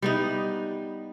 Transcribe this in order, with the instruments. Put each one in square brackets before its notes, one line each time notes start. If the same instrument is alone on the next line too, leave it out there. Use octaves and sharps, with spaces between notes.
[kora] G3 B3 D#4